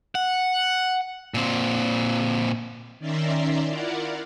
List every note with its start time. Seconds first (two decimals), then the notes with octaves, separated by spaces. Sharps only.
0.15 F#5
1.34 A#2 C4
2.99 D#3 C#4 D5 E5 A#5 C6
3.68 E4 F4 A#4 D5 F5 F#5